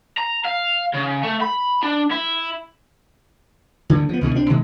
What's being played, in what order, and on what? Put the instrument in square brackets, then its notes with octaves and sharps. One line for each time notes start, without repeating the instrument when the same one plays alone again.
[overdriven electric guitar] A#5
F5
C#3
A3
B5
D4
E4
[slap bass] D2 D3
F3 B3
C#2 B2 D3 E3
B1 C4 D4
B2 D#3 G#3